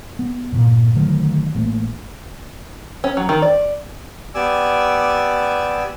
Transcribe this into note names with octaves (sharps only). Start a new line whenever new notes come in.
B3
G2 A#2
D3 D#3 F#3 A3
A1 A3 A#3
C#4
F#3
D#3
D5
B3 G4 D5 G#5 D6 E6